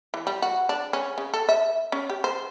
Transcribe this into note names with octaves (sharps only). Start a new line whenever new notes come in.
E3
G3
F#4
D4
C#4
C#3
A4
E5
C#4
G4
C5